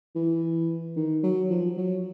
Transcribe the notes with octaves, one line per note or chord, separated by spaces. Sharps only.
E3
D#3
F#3
F3
F#3